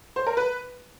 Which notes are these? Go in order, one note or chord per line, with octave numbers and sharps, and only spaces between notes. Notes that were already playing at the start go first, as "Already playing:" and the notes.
C5
A#4
B4